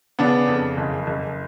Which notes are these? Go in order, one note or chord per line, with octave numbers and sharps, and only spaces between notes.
C#3 B3 D4
F2
F#1
F#1